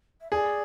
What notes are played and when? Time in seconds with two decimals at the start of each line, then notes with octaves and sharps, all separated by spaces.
0.21 E5
0.32 G#4 D5